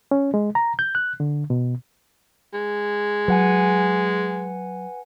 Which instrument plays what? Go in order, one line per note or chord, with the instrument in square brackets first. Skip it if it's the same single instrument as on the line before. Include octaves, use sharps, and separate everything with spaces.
[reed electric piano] C#4
G#3
A#5
G6
F#6
D3
B2
[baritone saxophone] G#3
[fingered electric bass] F#3 [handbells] B4 F#5 G#5